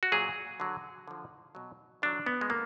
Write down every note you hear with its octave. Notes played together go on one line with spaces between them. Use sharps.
F#4
A#2 F#3 G#4
D3 F#3
D3 F3
B2 F#3
D3 F#3 D4
B3
G#3
D3 A#3